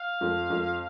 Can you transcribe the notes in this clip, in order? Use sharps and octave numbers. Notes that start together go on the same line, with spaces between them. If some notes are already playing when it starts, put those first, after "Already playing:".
Already playing: F5
F2
F2